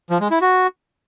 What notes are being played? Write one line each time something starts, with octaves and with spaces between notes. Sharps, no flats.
F3
G#3
E4
F#4